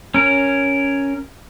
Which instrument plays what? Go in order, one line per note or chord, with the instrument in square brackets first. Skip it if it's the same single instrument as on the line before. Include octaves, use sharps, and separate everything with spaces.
[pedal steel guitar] C#4 A#4